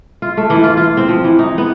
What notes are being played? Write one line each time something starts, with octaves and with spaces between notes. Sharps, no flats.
F4
A3
E3
F4
F4
C4
F3
E3
D#4
B3